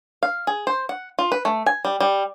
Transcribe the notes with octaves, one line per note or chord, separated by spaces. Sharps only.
F5
G#4
C5
F#5
F4
B4
A3
G#5
G3
G3